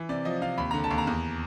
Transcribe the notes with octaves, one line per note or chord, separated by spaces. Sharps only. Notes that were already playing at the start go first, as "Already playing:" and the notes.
Already playing: E3
C3 D5
F3 D#5
C3 F5
D#2 B5
D3 A#5
A5
D#2
A#5
E2